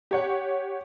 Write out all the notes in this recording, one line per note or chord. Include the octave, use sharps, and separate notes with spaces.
G4 C#5 F#5